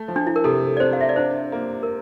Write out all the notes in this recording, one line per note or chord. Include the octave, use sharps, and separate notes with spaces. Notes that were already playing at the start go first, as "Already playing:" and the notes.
Already playing: A3
F3
D4
E4
A#4
C3 A4
D5
C4 C5
F5
E5
D5
D4 C5
A#3
A#4